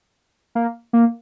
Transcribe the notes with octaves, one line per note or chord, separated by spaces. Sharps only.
A#3
A#3